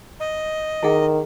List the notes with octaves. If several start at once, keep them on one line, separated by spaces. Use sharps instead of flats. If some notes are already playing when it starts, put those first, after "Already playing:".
D#5
D#3 E4 G#4 F#5